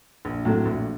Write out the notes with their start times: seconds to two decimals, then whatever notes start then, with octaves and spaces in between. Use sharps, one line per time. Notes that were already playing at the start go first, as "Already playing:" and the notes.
0.25 A#1
0.45 A2 F#3 A3 C4
0.65 A#1